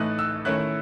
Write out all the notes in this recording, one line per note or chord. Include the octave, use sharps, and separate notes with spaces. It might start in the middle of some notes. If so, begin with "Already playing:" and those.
Already playing: A2 E3 A3 D#4 F#6
E6
D#3 A3 C#4 E4 F#6